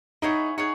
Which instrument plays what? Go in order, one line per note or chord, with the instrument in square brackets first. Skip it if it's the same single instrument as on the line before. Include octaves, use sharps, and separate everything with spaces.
[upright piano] D#4 [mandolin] E4 G#4 C#5 F#5
[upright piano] D#4 [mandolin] G#4 C#5 F#5